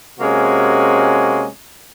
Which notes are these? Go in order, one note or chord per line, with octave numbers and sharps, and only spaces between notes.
C3 G#3 A#3 C#4 F#4